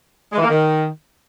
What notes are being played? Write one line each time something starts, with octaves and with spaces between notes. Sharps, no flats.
G#3
E3
A#3
D#3